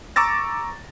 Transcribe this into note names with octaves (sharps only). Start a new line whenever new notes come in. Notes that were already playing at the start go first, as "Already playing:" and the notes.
A#5 C#6 D6 E6 A6 A#6